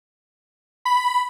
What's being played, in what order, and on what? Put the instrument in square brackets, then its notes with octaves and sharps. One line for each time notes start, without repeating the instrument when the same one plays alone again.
[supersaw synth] B5